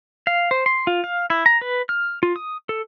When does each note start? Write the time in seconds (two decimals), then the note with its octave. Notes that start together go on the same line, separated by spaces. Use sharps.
0.27 F5
0.51 C5
0.66 C6
0.87 F4
1.04 F5
1.30 E4
1.46 A#5
1.61 B4
1.89 F6
2.23 F4
2.36 D#6
2.69 A4